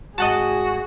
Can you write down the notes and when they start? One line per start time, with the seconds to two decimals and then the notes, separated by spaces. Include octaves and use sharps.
0.18 G#1 F#4 G#4 D#5 F#5 A5